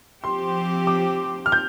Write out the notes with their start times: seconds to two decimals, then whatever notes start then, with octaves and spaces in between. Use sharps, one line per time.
0.24 F3 C4 G4 C6
0.87 D6
1.46 F6
1.52 G6